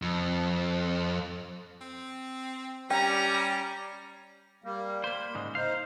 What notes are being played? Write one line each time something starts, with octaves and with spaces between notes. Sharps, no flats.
F2
C4
G3 C#4 G4 A#5
G3 A#3
A#3 C5 B5
G#2 C#3 G#3
D#4 C5 F5